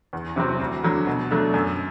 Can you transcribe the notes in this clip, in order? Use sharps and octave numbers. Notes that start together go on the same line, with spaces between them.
E2
C3 F#3 C4
D2
D3 F#3
B2
F#3 A3 D4
F#2